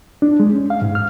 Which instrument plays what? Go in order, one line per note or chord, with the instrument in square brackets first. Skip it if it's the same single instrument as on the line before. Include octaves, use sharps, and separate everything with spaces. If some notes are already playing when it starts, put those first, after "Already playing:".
[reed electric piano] D4
G#3
C#4
F5
G#2
F6